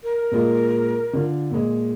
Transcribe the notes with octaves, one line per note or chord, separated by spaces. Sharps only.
A#4
A#2 G#3 F4
D3 F4
A#2 G#3